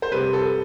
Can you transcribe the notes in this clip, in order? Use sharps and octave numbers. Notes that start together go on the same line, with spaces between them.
C5
C3 G3 B4
A4